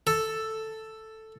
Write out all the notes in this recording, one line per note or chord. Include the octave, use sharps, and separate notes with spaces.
A4